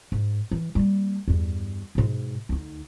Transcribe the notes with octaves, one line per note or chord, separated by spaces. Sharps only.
G#2
E3
G3 A#3
E2 G2
G#2 B2
D2 D#4